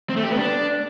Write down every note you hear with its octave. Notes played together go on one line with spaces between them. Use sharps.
C4
A3
G4
B3
D4